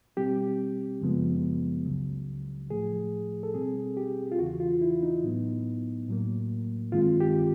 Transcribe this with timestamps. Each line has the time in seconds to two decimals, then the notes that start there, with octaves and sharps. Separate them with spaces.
0.17 B2 G3 C4 G4
1.01 F#2 C#3 F3 G#3 B3
1.86 C#2 C#3 F#3
2.70 A2 F3 A3 G#4
3.43 A4
3.54 B2 G3 C4 G#4
3.97 G4
4.32 F4
4.39 E2 C#3 E3 F#4
4.60 F4
4.82 E4
5.03 D#4
5.24 A2 F#3 B3
6.08 A2 F#3 A#3
6.92 G2 D#3 G#3 C4 F4
7.20 G4